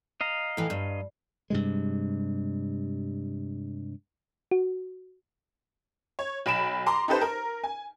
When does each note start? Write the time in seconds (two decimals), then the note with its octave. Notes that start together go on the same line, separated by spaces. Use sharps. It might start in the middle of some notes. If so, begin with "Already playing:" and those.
0.21 D#5 F5 A#5
0.57 A2 E3
0.70 G2
1.50 G2 C3 G#3
4.51 F#4
6.19 C#5
6.46 B1 B5 D7 E7
6.86 A#5 C6 D6
7.08 D#4 G4 A4 B4 C5
7.21 A#4
7.63 G#5